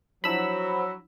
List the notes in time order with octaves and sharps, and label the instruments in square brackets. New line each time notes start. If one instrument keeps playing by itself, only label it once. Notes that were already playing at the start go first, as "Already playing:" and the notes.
[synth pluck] F3 D4 E4 [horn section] F#3 [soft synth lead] C5 [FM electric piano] B5 E6